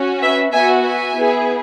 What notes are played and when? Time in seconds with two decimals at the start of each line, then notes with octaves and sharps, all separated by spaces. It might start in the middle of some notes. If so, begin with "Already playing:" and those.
Already playing: C#4 F#4
0.22 B4 E5
0.52 B3 F#4 E5 G#5
0.83 E5 G#5
1.15 B3 E4 G#4